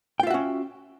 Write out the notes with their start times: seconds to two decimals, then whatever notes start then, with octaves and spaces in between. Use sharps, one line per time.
0.20 G5
0.23 F4
0.27 E5
0.30 F#4
0.34 C#4